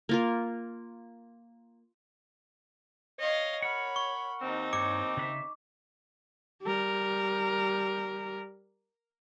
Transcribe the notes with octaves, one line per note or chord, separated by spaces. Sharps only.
A#3 F4 A#4
C#5 D#5 F5
A#4 F#5 B5
C#6
D#2 C4 D#4
G2 C#5 D6
C#3 B4 E5
G3 A#4